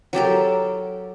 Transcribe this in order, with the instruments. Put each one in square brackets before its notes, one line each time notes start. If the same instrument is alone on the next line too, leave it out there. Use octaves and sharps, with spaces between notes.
[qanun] F#3 G4 A4 A#4